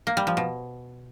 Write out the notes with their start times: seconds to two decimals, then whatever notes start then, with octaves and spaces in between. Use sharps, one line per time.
0.07 A#3
0.17 G3
0.27 F3
0.37 B2